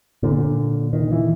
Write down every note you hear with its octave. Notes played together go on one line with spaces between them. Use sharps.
A#2 D3
D#3
E3